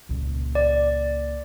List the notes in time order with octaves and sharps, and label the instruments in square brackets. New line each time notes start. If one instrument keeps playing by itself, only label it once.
[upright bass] C#2 A#2
[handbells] D5